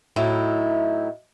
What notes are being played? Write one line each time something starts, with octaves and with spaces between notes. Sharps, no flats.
A2 F#3 D#4 E4